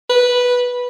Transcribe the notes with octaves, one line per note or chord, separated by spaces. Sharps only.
B4